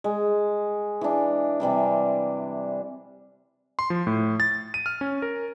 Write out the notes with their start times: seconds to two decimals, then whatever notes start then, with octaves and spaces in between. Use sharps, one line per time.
0.04 G#3
1.01 E3 D4
1.60 C3 E3 G3 D4
3.79 C6
3.90 F3
4.07 A2
4.40 A6
4.74 D#7
4.86 F6
5.01 C#4
5.22 A#4